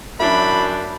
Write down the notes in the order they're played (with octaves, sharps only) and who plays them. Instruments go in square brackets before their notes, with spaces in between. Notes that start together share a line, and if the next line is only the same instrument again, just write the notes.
[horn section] F#2 [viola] D4 [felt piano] E4 [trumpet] B5